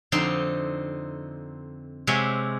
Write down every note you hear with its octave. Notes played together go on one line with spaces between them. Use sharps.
F2 D3 C4 D#4 C6
C3 G#3 C#5 E5 F#5 G#5